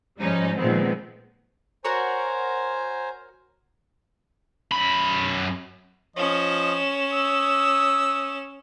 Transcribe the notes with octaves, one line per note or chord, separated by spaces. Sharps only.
G#2 F3 G3 C#4 D#4
A#2 D#3 F3 G#3 B3 C4
F#4 A#4 C5 C#5 G#5 A#5
F#2 B5
F3 C#4 D#5 E7
D#6 E6